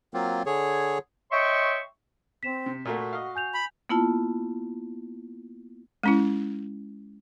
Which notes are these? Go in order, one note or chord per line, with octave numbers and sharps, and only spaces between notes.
F#3 A#3 C4 F4
D3 G#4 C#5
C#5 D#5 E5 G5 C6 C#6
C4 B6 E7
C3
A#2 A3 A#3 F#4
D#5 F5
G#5 G6 F7
B5
A#3 B3 E4 F4 A5
G#3 C#4 E4